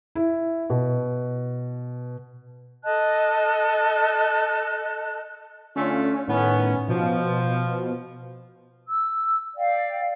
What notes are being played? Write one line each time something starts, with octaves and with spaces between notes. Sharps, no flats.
E4
B2
A4 D#5 A5 F#6
D3 A3 C#4 F4
A2 D#3 B3 C#4
B2 F3
E6
D5 F5 G5